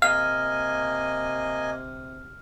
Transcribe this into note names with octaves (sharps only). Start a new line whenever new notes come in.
C3 A#3 D#5 F5 G#5 F6